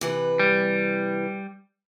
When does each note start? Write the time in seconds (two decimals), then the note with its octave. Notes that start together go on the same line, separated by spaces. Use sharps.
0.01 C3 E3 B4
0.39 G3